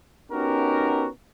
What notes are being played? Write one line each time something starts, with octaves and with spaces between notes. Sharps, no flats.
B3 C#4 D#4 F#4 G4 A#4